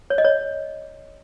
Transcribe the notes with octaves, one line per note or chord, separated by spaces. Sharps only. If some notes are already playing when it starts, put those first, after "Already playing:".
C#5
D#5
C#5